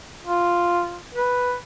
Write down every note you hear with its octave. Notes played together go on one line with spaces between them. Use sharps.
F4
B4